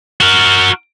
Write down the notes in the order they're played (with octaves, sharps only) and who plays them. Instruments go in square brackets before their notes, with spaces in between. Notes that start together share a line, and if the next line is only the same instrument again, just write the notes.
[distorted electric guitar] F#4 A#4